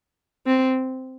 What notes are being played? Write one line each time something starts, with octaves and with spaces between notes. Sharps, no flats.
C4